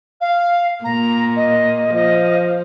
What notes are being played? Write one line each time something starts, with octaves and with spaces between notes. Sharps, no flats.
F5
A#2 A#3 A#5
D#5
F3 D#5